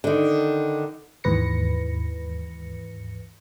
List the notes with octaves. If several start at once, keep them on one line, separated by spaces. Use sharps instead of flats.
D3 D#3
D#2 G#2 E3 B4 A#6 C#7